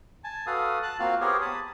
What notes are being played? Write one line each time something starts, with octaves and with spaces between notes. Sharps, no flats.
G#5 A5
F#4 A4 B4 F5 D#6
A5 F#6
A#3 C4 F4 F#4 F5
B3 G4 G#4 A#4 C5 C#5
A5 B5 D#6